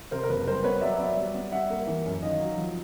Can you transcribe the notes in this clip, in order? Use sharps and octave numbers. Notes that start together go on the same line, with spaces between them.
C3 A#4 C5
A#4
F#1 B4
G3 A#4 C5
B3 B4 C#5
F#3 D5 E5
B3 D5 E5
G3
B3
G3 E5 F#5
A#3
E3
F#2
D#3 D#5 F5
F#3
F3